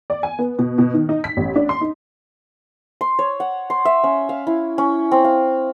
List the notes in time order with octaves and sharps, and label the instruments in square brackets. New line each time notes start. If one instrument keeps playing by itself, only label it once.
[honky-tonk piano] D5
G#5
B3
B2
B2
D#3
D#4
B6
A1
D4
C6
D#4
[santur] C6
C#5
F#5
C6
E5
C#4
F5
E4
C#4
C4
F5